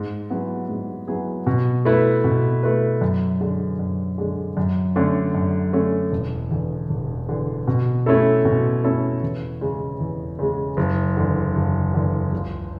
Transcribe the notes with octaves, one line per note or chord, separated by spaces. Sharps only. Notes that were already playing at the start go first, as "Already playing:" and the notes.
Already playing: G#2
F#3 B3 E4 G#4
G#2
F#3 B3 E4 G#4
B2
A3 E4 B4
B2
A3 E4 B4
F#2
D3 G#3
F#2
D3 G#3
F#2
D3 A3 C#4
F#2
D3 A3 C#4
E1
E2 D3
E1
E2 D3
B2
A3 C#4 E4 A4
B2
A3 C#4 E4 A4
E2
C#3 G#3
E2
C#3 G#3
F#1
E2 D3
F#1
E2 D3
C#2